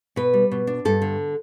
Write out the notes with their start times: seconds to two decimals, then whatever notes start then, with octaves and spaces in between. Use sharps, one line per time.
0.16 B2 B4
0.34 G3
0.51 B2
0.67 D4
0.85 G2 A4
1.02 D3